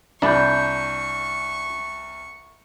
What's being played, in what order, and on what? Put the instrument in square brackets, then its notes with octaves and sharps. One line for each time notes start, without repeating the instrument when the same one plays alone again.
[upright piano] C2 [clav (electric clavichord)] D4 A5 [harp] B5 G6 [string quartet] C#6